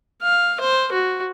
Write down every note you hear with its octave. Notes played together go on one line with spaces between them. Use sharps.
F5
C5
F#4